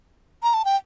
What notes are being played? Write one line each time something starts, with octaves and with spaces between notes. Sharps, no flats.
A#5
A5
G5